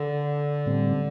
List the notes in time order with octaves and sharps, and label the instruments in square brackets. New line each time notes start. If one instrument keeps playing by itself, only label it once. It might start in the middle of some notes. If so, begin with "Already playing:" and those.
Already playing: [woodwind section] D3
[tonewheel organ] A2 G3 C4